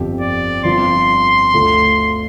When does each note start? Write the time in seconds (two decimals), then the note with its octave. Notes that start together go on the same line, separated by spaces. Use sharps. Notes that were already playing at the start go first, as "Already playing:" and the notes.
Already playing: G1 F2 F3 C4 G4
0.21 D5
0.65 G1 G2 F3 C4 F4 C6
1.54 D2 D3 A3 F4 A4